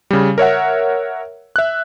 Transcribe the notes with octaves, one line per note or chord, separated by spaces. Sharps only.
C#3 G3
A#4 C#5 E5 F#5
E5 F#6